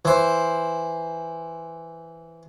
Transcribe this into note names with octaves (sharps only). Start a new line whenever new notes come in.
E3 C5